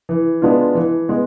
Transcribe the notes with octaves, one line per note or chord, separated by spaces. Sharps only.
E3
G#3 B3 D4 F4
E3
G#3 B3